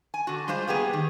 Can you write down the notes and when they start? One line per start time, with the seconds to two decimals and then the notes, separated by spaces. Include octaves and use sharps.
0.14 G#5
0.27 D3 F#4
0.48 G3 G#3 F4 C5
0.68 A#3 B3 G4 G#4
0.93 D#3